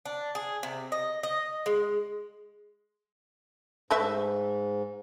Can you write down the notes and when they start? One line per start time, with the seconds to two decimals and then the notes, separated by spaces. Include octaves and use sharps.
0.05 D4
0.35 G#4
0.63 C3
0.92 D#5
1.23 D#5
1.66 G#3
3.91 G#2 A3 B4 E5